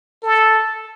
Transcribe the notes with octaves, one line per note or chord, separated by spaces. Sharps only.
A4